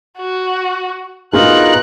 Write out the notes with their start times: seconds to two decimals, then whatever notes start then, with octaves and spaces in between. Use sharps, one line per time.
0.18 F#4
1.33 B2 D4 D#4 F4 G#4 A#4 F#6